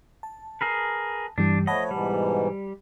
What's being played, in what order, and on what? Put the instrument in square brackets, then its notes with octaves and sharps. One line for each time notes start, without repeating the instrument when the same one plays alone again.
[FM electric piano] A5
[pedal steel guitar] G#4 A#4 B4
[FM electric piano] G2 E3 G3 [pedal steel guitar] D4
[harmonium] F3 A3 C#5 [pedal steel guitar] D#5 [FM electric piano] F#5 A5 B5
[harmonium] G#2 B2 E3 [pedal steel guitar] G3